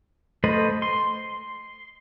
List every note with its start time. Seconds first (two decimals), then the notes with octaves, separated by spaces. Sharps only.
0.44 A3 B4 C5 D#5 B5
0.82 C6